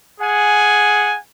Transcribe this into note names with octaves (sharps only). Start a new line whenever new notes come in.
G#4 F#5 G#5